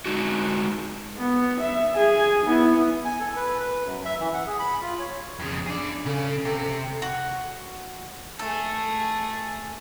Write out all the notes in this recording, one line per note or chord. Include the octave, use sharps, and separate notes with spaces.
G#3 D#4 F#4
B3
E5
G#4 G#5
B3 E4
G#5
A4
B4
B4
F#2
E5
E3
F#5
G#4
B5
F4
C#5
F2 C#3
D4 G#4 D5
C#3 A4
C3
F#4
A3 G#4 A4